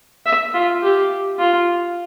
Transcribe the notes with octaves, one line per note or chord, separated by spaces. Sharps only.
E5
F4
G4
F4